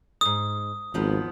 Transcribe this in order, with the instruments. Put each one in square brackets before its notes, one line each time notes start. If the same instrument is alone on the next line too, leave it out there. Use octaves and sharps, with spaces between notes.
[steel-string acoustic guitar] E2 G#2 [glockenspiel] D#6
[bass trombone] G#1 [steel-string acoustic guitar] D#2 F3 B3